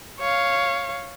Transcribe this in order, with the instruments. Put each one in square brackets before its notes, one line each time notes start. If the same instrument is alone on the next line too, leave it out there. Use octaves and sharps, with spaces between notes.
[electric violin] C#5 F5